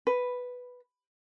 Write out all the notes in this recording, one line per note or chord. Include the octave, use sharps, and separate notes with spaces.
B4